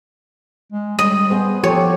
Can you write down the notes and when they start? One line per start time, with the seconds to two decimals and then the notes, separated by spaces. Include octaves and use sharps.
0.72 G#3
0.99 G3 D#5
1.30 B3 G#4 C5
1.64 F3 G4 A4 C#5